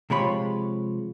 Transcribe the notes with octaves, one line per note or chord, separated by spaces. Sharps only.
C3 F3 G#3 F4 C#5 B5